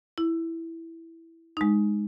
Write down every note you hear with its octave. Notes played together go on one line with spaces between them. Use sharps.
E4
G#3 D#4